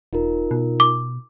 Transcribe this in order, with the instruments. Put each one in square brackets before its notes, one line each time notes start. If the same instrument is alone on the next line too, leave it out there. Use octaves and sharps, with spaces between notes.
[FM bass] E1 [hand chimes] D#4 F4 A#4
[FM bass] B2
[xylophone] D6